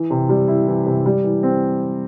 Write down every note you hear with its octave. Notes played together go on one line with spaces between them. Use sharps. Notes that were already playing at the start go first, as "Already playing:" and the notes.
Already playing: E3
C3
G3
E4
E3
C3
G3
E3
C4